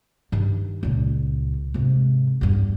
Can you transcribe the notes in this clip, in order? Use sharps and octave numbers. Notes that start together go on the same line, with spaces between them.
G2 D#3
C#2 A#2
G#2 C3
E2 G2